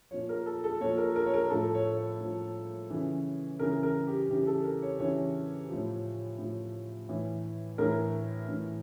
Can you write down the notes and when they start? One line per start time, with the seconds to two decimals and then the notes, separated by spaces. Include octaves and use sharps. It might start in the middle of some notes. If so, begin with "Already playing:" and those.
0.11 A#2 F3 C#5
0.29 A#4
0.46 A4
0.64 A4
0.80 A#2 F3 C#5
0.98 A#4
1.16 A#4
1.26 C#5
1.34 A#4
1.50 A2 F3 A4
1.75 C#5
1.98 C#5
2.20 A2 F3
2.90 C#3 E3
3.59 C#3 E3 A#4
3.83 A#4
4.07 G4
4.29 C#3 E3 G4
4.47 A4
4.64 A#4
4.82 C#5
4.99 C#3 E3 C#5
5.69 A2 F3
6.38 A2 F3
7.09 A2 E3
7.78 A2 E3 A#4
8.48 A2 E3